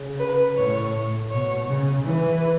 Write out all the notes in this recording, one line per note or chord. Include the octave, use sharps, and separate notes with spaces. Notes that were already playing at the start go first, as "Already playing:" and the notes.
Already playing: C#3
B4
A2 C#5
B2 C#5
C#3
E3 B4